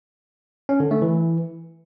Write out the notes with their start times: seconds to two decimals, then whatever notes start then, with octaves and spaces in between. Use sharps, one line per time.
0.69 C#4
0.80 D3
0.91 A3
1.02 E3